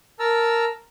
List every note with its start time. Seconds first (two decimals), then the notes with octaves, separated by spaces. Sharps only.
0.20 A#4 A5 A#5 E6